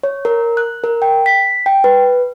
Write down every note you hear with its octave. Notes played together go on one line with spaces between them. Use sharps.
C#5
A#4
F#6
A#4
G5
B6
G5
B4